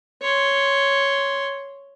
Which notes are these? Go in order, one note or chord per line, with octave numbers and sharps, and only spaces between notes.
C#5 C6